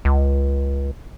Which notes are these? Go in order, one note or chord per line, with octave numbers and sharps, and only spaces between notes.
C#2